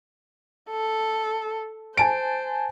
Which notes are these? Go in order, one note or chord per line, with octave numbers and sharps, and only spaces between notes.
A4
C5 G#5 A5 D7